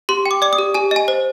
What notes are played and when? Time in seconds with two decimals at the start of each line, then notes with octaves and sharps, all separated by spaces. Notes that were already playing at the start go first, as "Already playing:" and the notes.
0.09 G4 C6
0.26 G5
0.31 D6
0.42 D5 D6
0.53 D#6
0.58 G4
0.74 G4 G#5
0.91 D#5 G#5
1.08 C5